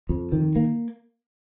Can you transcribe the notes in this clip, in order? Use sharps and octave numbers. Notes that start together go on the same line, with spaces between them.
F2
D#3
A#3